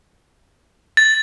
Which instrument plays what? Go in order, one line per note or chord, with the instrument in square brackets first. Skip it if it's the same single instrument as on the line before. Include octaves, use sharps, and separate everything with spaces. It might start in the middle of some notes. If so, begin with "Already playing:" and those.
[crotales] A6